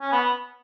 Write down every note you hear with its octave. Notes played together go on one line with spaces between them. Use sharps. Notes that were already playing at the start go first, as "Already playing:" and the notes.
C#4
B3